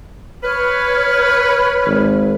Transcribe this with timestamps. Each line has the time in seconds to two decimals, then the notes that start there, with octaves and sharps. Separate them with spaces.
0.43 B4 C#5 F6
1.86 G#1